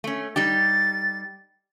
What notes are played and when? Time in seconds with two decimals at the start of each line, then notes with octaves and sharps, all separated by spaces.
0.04 A3 C#4
0.36 G3 D#4 G4 A6